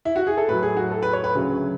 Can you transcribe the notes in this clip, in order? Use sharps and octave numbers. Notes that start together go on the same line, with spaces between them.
E4
F#4
G#4
A4
A2 F#3 B4
G#4
F#4
A4
B4
C#5
B4
D2 C#3 F#3